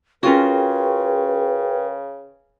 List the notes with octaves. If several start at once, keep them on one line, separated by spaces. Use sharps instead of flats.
C#3 C#4 F4 F#4 G#4 A#4 B4 G5